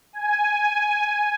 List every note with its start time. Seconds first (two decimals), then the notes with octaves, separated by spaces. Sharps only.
0.13 G#5
0.48 G#5